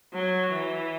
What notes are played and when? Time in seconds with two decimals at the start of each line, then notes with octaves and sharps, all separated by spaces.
0.14 F#3
0.53 E3